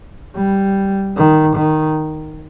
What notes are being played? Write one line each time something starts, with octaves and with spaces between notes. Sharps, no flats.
G3
D#3
D#3